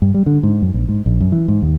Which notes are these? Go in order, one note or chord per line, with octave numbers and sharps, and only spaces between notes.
G2
G3
D3
G#2
F#2
A#1
G#2
A#1
F#2
E3
G#2
D#2